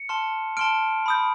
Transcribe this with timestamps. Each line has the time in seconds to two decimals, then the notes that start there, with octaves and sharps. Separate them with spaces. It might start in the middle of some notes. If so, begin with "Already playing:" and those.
Already playing: C#7
0.09 A5 C6 F6
0.57 A5 C6 F6 D7
1.06 B5 D#6 G6